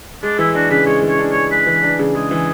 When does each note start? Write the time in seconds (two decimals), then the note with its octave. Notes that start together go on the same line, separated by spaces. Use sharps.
0.23 G#3 D4
0.39 E3 E4
0.55 D4 F#4
0.71 C#3 B4
0.86 G#3 C#5
1.03 E3
1.10 C#5
1.19 D4
1.32 C#3 C#5
1.51 G#3 B4
1.67 E3
1.83 D4
1.99 C#3
2.15 G#3 G#4
2.31 E3